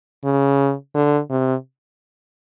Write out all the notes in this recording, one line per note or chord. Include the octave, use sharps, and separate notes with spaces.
C#3
D3
C3